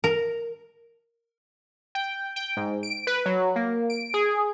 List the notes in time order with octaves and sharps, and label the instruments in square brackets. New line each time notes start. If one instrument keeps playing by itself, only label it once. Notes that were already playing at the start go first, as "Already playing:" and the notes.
[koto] A#4
[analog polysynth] G5
G5
G#2
D7
B4
F#3
A#3
D7
G#4